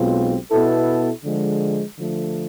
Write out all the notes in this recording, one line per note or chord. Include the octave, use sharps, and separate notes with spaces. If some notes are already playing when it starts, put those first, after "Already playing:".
Already playing: B1 B2 G#3 C4 F4
B2 B3 E4 A4
D3 F3 G#3
D3 F3 A3